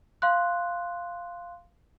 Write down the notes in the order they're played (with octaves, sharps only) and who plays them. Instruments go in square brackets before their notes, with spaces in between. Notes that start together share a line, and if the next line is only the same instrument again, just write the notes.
[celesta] F5 C6 F#6